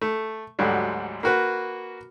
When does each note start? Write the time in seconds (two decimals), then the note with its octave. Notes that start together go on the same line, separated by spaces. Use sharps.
0.02 A3
0.59 D2 G#2 D3 F#3 G3
1.23 A#3 F#4 B4